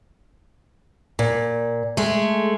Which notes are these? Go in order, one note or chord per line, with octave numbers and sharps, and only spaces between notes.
A#2
G#3 A3